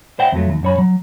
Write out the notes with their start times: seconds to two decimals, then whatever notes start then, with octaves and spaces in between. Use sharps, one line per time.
0.19 C5 D5 E5 F#5 G5
0.32 F2 F3 F#3 A3
0.50 D#2
0.63 F#2 C#5 B5
0.79 F#3